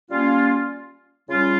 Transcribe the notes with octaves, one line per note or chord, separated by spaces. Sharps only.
G3 A#3 C#4 F4
C#3 G3 C#4 F4